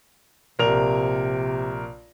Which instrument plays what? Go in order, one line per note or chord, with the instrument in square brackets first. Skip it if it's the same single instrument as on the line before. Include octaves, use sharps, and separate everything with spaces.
[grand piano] A#1 A#4 F7 [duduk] C3